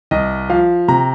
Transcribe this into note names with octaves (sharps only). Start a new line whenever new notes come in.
C2 D#5
F3 F5
C3 A#5